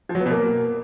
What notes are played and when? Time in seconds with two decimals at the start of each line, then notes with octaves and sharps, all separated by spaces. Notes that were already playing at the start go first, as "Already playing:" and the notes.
0.09 F3
0.15 F#3
0.20 B3
0.26 B2
0.31 A#3